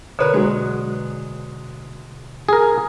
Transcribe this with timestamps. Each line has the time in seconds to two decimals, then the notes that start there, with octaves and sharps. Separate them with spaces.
0.19 B2 D3 A#4 B4 C#5
0.34 F#3 G#3
2.49 G#4 A#4